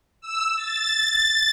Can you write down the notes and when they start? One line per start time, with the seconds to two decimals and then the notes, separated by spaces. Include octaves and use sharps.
0.21 E6
0.56 A6